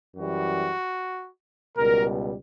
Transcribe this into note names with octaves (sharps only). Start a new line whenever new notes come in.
F#2 E3 G3 F#4
C#2 B2 G3 A#4